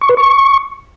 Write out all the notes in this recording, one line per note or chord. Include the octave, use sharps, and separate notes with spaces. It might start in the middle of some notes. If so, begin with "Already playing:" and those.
C#6
B4
C#6